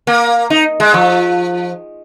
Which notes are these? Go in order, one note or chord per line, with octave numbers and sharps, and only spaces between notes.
A#3
D#4
G#3
F3